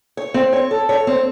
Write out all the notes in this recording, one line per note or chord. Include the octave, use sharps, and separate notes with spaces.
C#5
C4
C#5
A4
C#5
C4